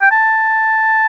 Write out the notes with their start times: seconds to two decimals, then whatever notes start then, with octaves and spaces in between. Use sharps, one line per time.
0.02 G5
0.11 A5